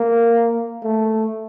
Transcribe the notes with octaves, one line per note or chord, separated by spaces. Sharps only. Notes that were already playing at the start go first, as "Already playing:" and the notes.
Already playing: A#3
A3